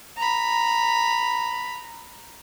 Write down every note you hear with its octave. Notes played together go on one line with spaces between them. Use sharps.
A#5 B5